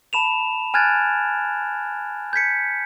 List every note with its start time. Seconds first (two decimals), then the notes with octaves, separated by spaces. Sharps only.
0.13 A5 B5 E7 F7
0.74 G#5 F6 F#6 G#6 A6 D7
2.33 G6 G#6 B6 C#7